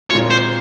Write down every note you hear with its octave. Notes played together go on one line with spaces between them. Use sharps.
A#2 G#3 C4 F4 C#5
C5